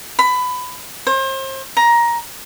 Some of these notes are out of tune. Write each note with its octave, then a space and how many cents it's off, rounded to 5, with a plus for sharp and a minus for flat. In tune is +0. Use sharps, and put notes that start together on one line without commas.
B5 +20
C5 +35
A#5 +15